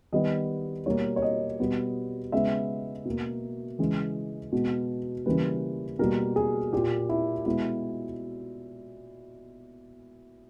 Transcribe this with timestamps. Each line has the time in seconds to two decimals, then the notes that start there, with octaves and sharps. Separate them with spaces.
0.13 D#3 G3 B3 D#5
0.86 B2 G3 A#3 C#5
1.16 C#5
1.22 D#5
1.60 B2 G3 B3
2.32 C#3 G#3 B3 E5
3.05 B2 A#3
3.79 C#3 E3 G#3
4.52 B2 G#3 B3
5.26 C#3 E3 G3 A#3 B4
5.99 B2 G3 A#3 A#4
6.36 G#4
6.73 A#2 A#3 G4
7.09 E4
7.46 B2 G#3 B3 E4